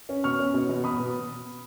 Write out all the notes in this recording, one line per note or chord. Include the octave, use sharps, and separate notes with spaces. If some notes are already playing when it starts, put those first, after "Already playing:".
C#4
B2 C#6 F6
C#4
B2
B2
B2 B5 D#6
B2